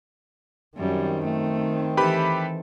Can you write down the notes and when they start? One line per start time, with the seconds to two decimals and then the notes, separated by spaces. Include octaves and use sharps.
0.77 F#2 D#3 G3 C4
1.24 A3
1.97 E3 G4 A4 B4 B5